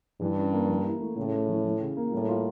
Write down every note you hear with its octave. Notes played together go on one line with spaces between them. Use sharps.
G2 E3
C#4
A#3
E3
E4
A3
A2 C#3
A3
E3
E3
C#3
A#3
A2 G3
F4